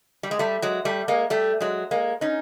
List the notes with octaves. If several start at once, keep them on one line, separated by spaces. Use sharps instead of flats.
G3
G#3
G3 A3
F#3 G#3
G3 A3
G#3 A#3
G3 A3
F#3 G#3
G#3 A#3
C#4 D#4